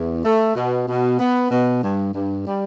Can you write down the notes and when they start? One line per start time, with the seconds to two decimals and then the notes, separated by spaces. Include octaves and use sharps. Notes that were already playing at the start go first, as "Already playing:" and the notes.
Already playing: E2
0.23 A3
0.55 B2
0.87 B2
1.19 B3
1.50 B2
1.82 G2
2.14 G2
2.45 G3